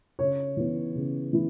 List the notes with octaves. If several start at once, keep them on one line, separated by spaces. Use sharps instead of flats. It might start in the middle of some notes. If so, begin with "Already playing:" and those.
C#3 C#5
E3 B3 E4
C#3
E3 B3 E4